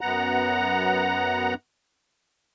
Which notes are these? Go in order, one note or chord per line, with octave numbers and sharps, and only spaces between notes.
F#2 B3 F#5 A#5